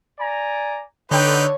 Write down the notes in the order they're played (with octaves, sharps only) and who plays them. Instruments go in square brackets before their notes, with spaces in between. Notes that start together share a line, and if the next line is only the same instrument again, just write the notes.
[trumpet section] D5 G#5 A#5
[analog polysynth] D3 [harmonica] D#4 B4 [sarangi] C#5 [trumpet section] G5